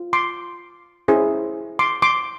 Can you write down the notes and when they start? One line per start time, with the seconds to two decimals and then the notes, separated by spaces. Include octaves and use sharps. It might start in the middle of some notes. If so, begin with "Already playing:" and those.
Already playing: F4
0.13 C6 D6
1.08 C#4 E4 G#4 C5
1.79 C6 D6
2.02 C6 D6